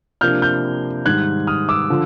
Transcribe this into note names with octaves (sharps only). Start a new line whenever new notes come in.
C3 F3 A#3 D4 F6 G6
F6 G6
G#2 D#3 G3 F#6 G#6
D#6 F6
D6 E6
D3 F3